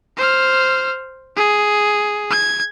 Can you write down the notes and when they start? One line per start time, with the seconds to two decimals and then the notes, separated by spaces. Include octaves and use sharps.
0.17 C5 F6
1.36 G#4
2.30 G#6